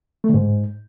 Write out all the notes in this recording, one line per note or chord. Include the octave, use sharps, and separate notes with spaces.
A3
D3
G#2